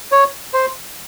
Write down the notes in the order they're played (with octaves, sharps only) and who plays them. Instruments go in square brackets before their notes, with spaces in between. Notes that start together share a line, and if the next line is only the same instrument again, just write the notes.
[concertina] C#5
C5